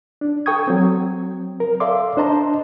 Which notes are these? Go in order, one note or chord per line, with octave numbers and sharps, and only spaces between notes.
D4
A4 G5 C#6 D#6 G#6
F#3 C4
A#4
A4 D5 E5 F5 C6 D6
D4 C5 D#5 A5 A#5 C6